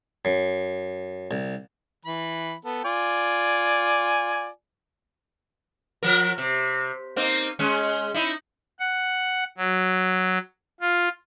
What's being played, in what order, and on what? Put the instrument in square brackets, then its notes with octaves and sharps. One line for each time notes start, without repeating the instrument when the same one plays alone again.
[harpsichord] F#2
C2
[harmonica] E3 B5
B3 A4
F4 D5 G#5
[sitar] F3 A#4
C3
A#3 C4 D#4
G#3 C#4
D#4 E4
[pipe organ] F#5
F#3
F4